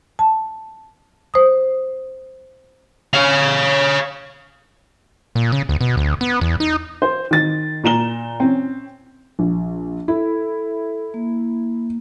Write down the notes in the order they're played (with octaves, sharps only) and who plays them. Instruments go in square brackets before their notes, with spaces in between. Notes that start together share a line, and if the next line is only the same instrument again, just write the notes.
[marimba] A5
C5 D#6
[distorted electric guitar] C#5 F5
[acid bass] A#2
C#3
D2
B2
D2
B3
E2
D#4
[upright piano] C5
D#3 A6
A#2 A#5 E7 G7
C4 C#4
[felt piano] A#1
[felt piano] E4 [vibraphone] A4
[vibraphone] A#3